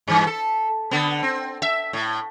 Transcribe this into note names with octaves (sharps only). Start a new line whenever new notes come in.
G2 E3
A4
D3 B3
C4
E5
A2